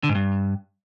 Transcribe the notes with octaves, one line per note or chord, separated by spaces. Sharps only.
D3
G#2
G2